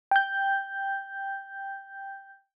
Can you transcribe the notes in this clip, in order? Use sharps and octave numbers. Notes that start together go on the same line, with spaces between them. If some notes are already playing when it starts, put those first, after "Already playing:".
G5 G6